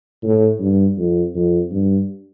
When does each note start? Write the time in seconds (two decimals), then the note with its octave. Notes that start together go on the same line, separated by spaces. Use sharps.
0.23 A2
0.60 G2
0.97 F2
1.34 F2
1.71 G2